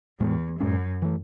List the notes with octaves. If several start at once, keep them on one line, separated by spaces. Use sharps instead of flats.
E2 A2 G#3 B3
F#2 A2 G#3 C#4
E3 A3